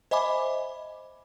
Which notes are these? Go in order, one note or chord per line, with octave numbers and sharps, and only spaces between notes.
C5 D#5 E5 G#5 B5 D6